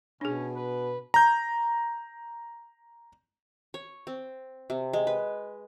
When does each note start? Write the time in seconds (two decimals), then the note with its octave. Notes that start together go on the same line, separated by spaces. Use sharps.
0.21 B2 C#4 D4 G#4
0.56 B4
1.14 A#5 G6
3.74 C#5
4.07 C4
4.70 C3
4.93 G#3
5.07 B4